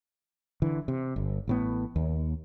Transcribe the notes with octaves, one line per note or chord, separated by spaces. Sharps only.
D3 E3
C3
G1
A1 A2 B3
D#2